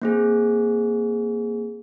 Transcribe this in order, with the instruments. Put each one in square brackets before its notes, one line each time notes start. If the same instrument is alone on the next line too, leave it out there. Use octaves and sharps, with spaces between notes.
[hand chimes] A#3 C4 G#4